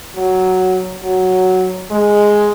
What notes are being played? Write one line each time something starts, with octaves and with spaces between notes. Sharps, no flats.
F#3
F#3
G#3